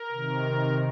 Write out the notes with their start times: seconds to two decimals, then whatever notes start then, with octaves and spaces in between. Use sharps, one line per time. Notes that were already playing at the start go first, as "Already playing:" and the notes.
Already playing: A#4
0.11 C3 D#3